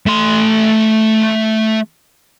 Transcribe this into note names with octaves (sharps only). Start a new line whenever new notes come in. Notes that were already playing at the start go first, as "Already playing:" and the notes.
A3 C6